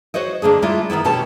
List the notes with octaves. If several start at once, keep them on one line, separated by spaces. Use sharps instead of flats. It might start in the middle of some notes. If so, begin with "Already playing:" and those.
F#4 C5 C#5 D#5
D3 A#3 D4 G#4
G3 G#3 A#3 E4 F4
D#3 F3 B3 E4
B2 C#4 F#4 G4 A4 A5